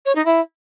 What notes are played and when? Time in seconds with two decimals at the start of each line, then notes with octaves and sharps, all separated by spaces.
0.05 C#5
0.15 D#4
0.25 E4